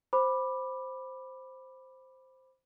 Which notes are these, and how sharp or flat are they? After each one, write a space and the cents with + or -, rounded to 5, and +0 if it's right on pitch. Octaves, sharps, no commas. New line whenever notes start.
C5 +0 B5 -5 D6 +10